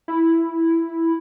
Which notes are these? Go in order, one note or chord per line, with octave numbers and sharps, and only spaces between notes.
E4